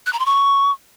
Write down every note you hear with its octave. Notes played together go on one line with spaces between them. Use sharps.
F#6
A#5
C6
C#6